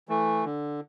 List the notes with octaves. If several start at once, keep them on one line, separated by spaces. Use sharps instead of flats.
E3 A3
D3